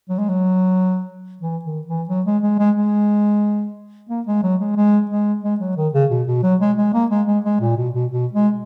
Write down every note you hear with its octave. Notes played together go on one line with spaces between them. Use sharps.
F#3
G#3
F#3
E3
D#3
E3
F#3
G#3
G#3
G#3
G#3
A#3
G#3
F#3
G#3
G#3
G#3
G#3
F#3
D#3
C#3
B2
B2
F#3
G#3
G#3
A#3
G#3
G#3
G#3
A#2
B2
B2
B2
G#3